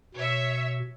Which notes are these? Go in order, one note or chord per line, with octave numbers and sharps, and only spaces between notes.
B2 C#5 E5